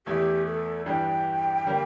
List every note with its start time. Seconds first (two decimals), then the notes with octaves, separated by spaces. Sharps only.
0.06 E2 E3 A3 E4 G4
0.46 A4
0.86 G2 E3 G3 D4 G5
1.65 D3 G3 A#3